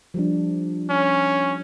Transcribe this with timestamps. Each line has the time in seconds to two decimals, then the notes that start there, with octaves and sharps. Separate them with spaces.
0.14 F3 G3 D4
0.90 C#4